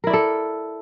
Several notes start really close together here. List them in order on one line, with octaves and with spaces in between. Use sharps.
A#4 E4 D5 A4